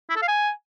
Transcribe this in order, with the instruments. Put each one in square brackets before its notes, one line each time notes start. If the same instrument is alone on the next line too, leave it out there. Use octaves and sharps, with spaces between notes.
[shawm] E4
A4
F5
G#5